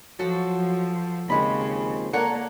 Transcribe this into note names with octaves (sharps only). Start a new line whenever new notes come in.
F3 F#3 F#4 A4
D#2 C#3 F3 G#3 C4 B5
A#3 A4 A#4 C#5 D5 F#5